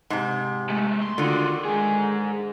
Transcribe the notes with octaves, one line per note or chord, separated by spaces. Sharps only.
G#2 C3
G#3 A3
C6
D3 D#3 F4 F#4
G#2 G#4